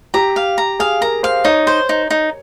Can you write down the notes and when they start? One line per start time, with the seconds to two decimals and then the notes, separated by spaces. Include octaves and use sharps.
0.14 G4 A#5
0.36 F5
0.58 A#5
0.80 G#4 F5
1.01 A#4 A#5
1.23 C5 F5
1.45 D#4 C#5
1.67 C5
1.89 D#4
2.10 D#4